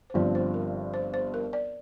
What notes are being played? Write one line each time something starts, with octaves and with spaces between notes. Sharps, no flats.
C5
G1 G2 F3 C4 D5
C5
A#4
C5
C5
A#4
D5